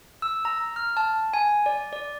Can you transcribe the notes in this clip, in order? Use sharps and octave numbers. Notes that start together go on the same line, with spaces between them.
E6
A#5
F6
A5
G#5
D5
D5